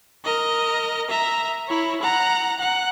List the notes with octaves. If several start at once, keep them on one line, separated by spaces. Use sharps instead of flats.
A#4 D#5
E5 A#5
E4 C#5
F#5 A#5
F#5